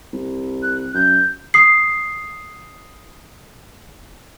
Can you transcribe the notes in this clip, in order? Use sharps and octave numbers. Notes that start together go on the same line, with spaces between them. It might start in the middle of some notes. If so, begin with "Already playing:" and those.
C2
F#6
F#2 G6
D#6 C7